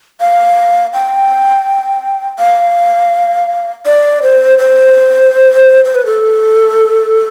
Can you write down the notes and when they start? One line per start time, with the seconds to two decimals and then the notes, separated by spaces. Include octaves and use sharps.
0.21 F5
0.94 G5
2.39 F5
3.86 D5
4.22 C5
4.58 C5
5.85 C5
5.95 B4
6.06 A4